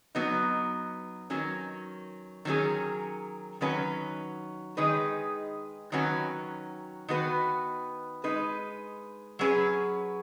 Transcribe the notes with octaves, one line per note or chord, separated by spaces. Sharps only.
F#3 B3 D#4
D#3 F#3 C#4
D#3 F#3 C#4 G#4
D#3 F#3 C#4 F#4 B4
D#3 G#3 D#4 G#4 B4
D#3 F#3 C#4 F#4 B4
D#3 B3 F#4 B4
G#3 D#4 B4
F#3 C#4 G#4 B4